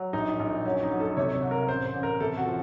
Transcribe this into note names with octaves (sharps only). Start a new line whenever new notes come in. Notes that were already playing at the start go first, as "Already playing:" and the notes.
Already playing: F#3
A#1 D#4
A#1
F#3 C#4
D#4
F#3
A4
C3 C#5
C#5
C2
A#4
A1 C5
C5
A1
A#4
C3 A4
F#4
F3